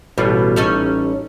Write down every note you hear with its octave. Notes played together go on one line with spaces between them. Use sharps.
A1 B2 G3 F4
C#4 D#4 A4